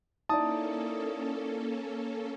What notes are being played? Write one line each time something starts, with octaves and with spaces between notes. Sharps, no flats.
A#3 C#4 D#4 E4 A4 D5 A5 D#6